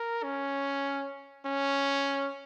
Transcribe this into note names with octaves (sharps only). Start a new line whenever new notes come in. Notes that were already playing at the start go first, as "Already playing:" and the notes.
Already playing: A#4
C#4
C#4